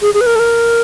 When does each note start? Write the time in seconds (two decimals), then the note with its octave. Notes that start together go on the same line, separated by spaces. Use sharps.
0.02 G#4
0.14 G#4
0.21 B4
0.26 A#4
0.35 A4
0.39 A#4